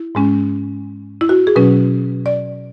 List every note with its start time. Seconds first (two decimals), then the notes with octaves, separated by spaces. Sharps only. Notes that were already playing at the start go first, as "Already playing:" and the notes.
Already playing: E4
0.15 G#2 G#3 C#4
1.21 E4
1.29 F#4
1.47 G#4
1.56 B2 F#3 C#4 B4
2.26 D5